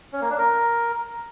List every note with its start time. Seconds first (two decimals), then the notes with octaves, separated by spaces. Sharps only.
0.13 C#4
0.21 A#3
0.30 D4
0.38 A#4